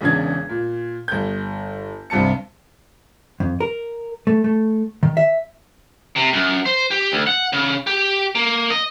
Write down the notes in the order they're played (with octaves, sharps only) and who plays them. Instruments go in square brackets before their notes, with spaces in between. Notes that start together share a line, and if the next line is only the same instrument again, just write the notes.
[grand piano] E1 E2 C#3 D4 G#6
A#2
G1 G6
C2 G2 C3 A5 C#7
[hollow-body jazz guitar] F2
A#4
A3
A3
D#3
E5
[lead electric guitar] C3
F#2
C5
G4
D2
F#5
C#3
G4
A#3
D#5